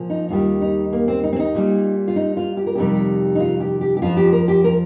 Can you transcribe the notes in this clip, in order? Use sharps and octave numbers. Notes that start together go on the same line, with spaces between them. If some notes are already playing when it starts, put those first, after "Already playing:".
Already playing: A#2 F3
D#4
D#2 D#3 G3 F4
D#4
A#3
C4
D#4
C4
D#4
A#2 G3
F4
D#4
F4
G4
A#4
F2 C3 D#3 G3 G4
D#4
F4
G4
G4
G4
F2 F3 F4
G4
A#4
G4
A#4